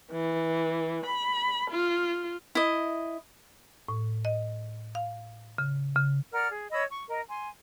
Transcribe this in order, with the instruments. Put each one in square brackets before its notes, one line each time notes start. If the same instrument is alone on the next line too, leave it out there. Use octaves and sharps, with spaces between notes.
[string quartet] E3
B5
F4
[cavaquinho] E4 D#5
[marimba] A2
D#5
F5
C#3
C#3
[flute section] A#4 D5 F#5 F6
G#4
C#5 D#5 B5 E6
C#6
A#4 D#5
G#5 C6